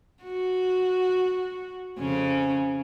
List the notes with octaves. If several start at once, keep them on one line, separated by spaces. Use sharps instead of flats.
F#4
F2 C#3 C#4